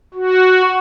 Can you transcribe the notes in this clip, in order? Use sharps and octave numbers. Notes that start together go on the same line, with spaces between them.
F#4